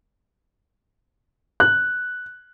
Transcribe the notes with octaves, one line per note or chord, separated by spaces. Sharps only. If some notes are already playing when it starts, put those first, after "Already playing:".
F#6